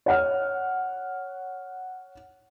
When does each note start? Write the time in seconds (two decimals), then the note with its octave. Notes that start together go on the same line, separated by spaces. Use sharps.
0.06 C#5 F#5 F6